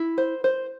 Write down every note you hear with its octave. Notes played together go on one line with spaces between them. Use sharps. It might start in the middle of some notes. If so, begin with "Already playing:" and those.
Already playing: E4
C5
C5